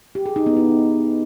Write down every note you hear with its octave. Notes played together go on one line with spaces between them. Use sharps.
G4
G#4
D#4
B3
E4